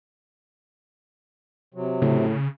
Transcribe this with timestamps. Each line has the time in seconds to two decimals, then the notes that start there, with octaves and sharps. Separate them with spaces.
1.74 C3 F#3
2.02 A2 C#3